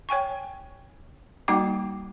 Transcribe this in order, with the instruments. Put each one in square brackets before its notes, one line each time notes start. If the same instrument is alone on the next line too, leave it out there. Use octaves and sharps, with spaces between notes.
[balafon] C#5 G5 G#5 C#6
G3 A#3 D#4 F#4 G5 D6